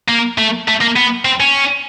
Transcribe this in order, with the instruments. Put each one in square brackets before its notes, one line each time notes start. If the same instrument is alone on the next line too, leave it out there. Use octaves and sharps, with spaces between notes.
[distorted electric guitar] A#3
A3
A3
A#3
B3
C4
C#4